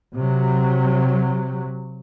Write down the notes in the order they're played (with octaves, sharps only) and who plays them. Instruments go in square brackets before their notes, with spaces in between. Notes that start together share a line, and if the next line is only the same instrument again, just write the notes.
[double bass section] C3 F#3